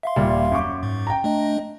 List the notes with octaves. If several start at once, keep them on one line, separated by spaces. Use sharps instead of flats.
E5 F5 C6
D#1 A#2 G3
F#2 C#6 D6
G#2
G5 A#5
A3 D4 D#5